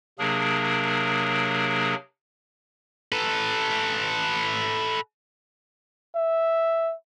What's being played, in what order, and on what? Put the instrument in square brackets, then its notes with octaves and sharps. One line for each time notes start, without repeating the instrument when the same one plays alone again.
[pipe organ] C3 F#3 A#3 D4 G#4 A#4
[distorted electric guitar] A4 B4
[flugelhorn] E5